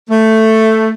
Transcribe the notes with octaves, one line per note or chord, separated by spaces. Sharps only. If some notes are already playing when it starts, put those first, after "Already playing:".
A3